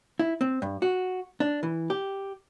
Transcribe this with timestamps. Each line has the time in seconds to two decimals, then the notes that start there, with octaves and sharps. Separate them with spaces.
0.19 E4
0.41 C4
0.62 G2
0.82 F#4
1.40 D4
1.63 E3
1.90 G4